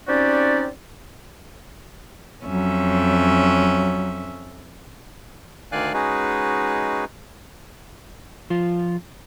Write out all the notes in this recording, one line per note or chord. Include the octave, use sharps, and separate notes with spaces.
C4 C#4 D#4 F#4 G4 D5
F2 F#3 C#4 E5
D2 D#3 D5 F5 G#5 F#6
G#3 C#4 D#4 F#4 G#4 B4
F3 F4